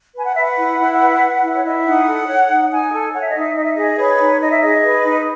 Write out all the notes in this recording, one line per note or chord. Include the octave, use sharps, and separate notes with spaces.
B4 G#5
F#5
B4 E5
F#5
E4
E4
B4
B4
E4
C#5
E4 D#5
E5
D#4 F#5
A4
C#5
D#4
D#4 G#5
A4
C#5 F#5
E5
D#5
D#4 E5
D#4 D#5
E5
G#4 D#5
B4 C#5
D#4
D#4 D#5
E5
G#4 D#5
B4
D#4